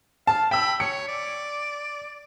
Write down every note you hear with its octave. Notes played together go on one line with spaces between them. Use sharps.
F5 A5
G5 B5 E6
C#5 C#7
D5